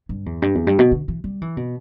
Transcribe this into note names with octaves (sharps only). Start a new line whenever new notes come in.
G2
E2
G2
E2
G2
B2
D3
E3
G3
E3
B2